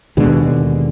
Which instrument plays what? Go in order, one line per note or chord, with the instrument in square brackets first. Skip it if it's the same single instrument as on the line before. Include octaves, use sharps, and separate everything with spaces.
[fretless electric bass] D#2 B2 D3 G#3